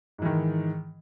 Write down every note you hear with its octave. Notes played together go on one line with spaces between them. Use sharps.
G#2 D#3 E3